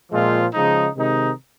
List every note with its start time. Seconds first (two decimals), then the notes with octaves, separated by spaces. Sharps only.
0.12 A#2 F3 G#3 C4 F4
0.54 C#3 F3 G#3 D#4
0.97 C3 D#3 G#3 D#4